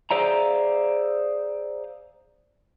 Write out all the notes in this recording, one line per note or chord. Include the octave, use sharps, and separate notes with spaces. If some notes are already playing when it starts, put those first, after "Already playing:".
G#4 C5 D5 E5 F5 A#5